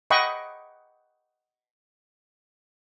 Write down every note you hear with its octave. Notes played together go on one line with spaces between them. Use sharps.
D#5 F#5 G5 B5 C#6